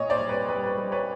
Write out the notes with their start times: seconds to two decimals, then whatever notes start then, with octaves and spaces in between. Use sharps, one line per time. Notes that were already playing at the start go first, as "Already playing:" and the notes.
Already playing: A#2 C#5 D#5
0.10 C5 D5
0.20 G3
0.29 B4 C#5
0.49 G3 B4
0.63 B4
0.78 G3
0.92 B4 C#5